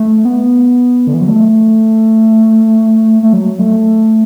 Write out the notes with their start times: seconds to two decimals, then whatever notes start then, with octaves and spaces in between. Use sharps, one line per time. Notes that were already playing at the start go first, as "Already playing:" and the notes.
Already playing: A3
0.25 B3
1.07 D3
1.14 E3
1.21 F#3
1.28 A3
3.23 A3
3.33 F#3
3.59 A3